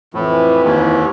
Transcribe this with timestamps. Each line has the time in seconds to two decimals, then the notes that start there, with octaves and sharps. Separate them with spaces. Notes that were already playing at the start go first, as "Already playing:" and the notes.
0.14 F2 A2 E3
0.64 D#2 G#2